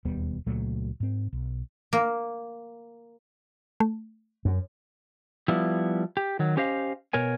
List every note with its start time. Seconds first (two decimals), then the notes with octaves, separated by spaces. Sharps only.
0.05 E1 D#2 G3 B3
0.46 C#2 A#2 F#3 A3
1.00 G#2 C4
1.33 B1
1.93 A#3
3.80 A3
4.45 F#2
5.48 F3 G3 B3 E4
6.17 G4
6.39 D#3 F#3
6.57 C#4 G4 C5 D#5 F5
7.13 B2 A#4 C#5 G#5